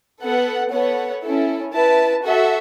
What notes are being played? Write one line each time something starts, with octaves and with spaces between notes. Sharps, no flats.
B3 A4 F#5
B3 A4 C#5 F#5
C#4 E4 A4
E4 B4 A5
F#4 A4 E5